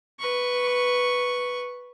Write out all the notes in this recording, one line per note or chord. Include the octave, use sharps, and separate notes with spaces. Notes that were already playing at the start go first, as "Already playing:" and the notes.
B4 C#6